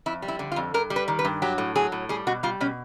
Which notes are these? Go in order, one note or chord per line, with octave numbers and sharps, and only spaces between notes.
F2 E4
G3
E4
D3
F4
F2
G2 A#4
G3
B4
D#3
B4
G2
F#3 G4
A2
F#3 G#4
A2
G3 G#4
B2 F#4
G3 F4
B2 C#4